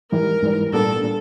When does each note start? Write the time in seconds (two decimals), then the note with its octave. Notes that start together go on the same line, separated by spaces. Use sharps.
0.12 G#2 E3 G3 A#4
0.43 G#2 E3 G3
0.73 A#2 G3 B3 D4 A4
1.03 A#2